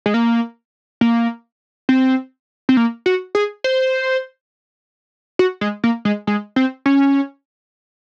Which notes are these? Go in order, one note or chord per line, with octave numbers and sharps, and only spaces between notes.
G#3
A#3
A#3
C4
C4
A#3
F#4
G#4
C5
F#4
G#3
A#3
G#3
G#3
C4
C#4